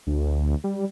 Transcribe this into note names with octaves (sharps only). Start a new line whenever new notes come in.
D2
G3